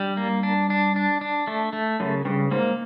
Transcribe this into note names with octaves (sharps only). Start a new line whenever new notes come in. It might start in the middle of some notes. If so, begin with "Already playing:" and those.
Already playing: G2 G3
A#3
D4
D4
D4
D4
A3
A3
F#2 C#3
G2 C#3
G#2 A#3